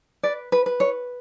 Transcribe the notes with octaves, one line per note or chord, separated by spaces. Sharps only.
B4 D5
B4
B4
C#5